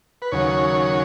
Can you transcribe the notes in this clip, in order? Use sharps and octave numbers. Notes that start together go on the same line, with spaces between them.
B4
D#2 C#3 F#3 C#5